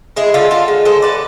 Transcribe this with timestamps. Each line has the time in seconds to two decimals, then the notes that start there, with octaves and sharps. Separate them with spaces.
0.16 G#3 E4 G#4
0.34 D3 F4 A4
0.51 D3 F4 A4
0.68 G#3
0.85 G#3 A4 C5
1.02 D3 B4 D5